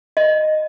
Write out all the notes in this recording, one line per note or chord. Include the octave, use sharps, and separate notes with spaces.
D#5